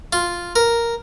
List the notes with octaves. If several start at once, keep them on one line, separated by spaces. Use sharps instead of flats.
F4
A#4